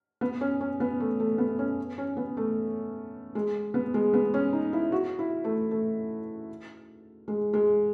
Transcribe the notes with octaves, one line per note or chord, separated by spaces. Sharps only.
B3
C#4
C#4
B3
A3
A3
B3
C#4
C#4
B3
A3
G#3
B3
G#3
B3
C#4
D#4
E4
F#4
E4
A3
A3
G#3
G#3